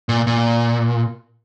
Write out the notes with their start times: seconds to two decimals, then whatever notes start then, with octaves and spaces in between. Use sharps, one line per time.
0.09 A#2
0.27 A#2